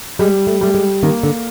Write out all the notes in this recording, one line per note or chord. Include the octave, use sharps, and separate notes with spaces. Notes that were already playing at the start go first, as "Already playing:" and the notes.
G3 G#3
A3
G3 A3
G#3
D#3 A#3
D3